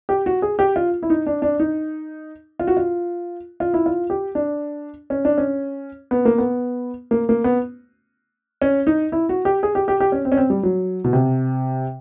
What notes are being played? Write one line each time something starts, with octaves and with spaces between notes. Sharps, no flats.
G4
F#4
G#4
G4
F4
E4
D#4
D4
D4
D#4
F4
F#4
F4
F4
E4
F4
G4
D4
C#4
D4
C#4
B3
A#3
B3
A#3
A#3
B3
C#4
D#4
E4
F#4
G4
G#4
G4
G4
G4
C#4
C4
C#4
C4
G3
F#3
B2
C3